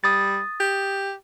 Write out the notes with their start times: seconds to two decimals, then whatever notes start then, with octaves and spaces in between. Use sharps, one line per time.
0.04 G3 D#6 A6
0.60 G4